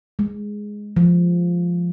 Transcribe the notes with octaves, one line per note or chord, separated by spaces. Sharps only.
G#3
F3